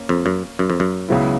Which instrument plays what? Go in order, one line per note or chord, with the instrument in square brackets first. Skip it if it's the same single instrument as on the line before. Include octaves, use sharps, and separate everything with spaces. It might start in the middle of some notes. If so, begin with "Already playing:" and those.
Already playing: [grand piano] A#3 C#4
[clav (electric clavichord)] F2
F#2
F#2
F2
F#2
[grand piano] C#2 C#3 F#3 B3 E4